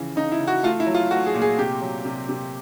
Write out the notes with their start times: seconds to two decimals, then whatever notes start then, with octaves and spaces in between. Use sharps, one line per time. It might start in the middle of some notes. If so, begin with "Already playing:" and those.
Already playing: C#3 E3 F3
0.16 C#3 D#4
0.32 E4
0.39 C#3
0.48 F#4
0.63 A3 F4
0.80 E4
0.87 F#3
0.95 F4
1.11 A3 F#4
1.26 G#4
1.34 A#2
1.42 G#4
1.58 C3 G4
1.82 F#3
2.05 C3
2.29 C3